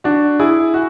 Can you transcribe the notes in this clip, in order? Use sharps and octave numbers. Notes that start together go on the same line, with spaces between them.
D4 F#4
E4 G#4
F#4